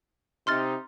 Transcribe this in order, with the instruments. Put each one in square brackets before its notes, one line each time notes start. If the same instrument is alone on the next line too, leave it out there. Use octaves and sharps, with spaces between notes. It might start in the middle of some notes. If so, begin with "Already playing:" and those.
[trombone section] C3 D#4 [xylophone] C6 F6 A6